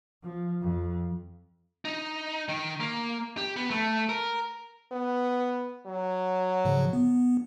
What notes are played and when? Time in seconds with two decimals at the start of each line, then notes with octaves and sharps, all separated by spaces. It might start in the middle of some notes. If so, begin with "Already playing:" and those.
0.23 F3
0.62 F2
1.85 D#4
2.49 D#3
2.80 A#3
3.37 G4
3.56 B3
3.71 A3
4.09 A#4
4.92 B3
5.86 F#3
6.65 G#2 C#3 F3
6.93 B3